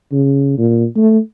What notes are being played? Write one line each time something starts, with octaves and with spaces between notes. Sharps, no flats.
C#3
A#2
A3